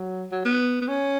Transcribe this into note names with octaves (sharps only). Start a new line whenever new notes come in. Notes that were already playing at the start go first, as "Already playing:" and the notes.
Already playing: F#3
F#3
B3
B3
C#4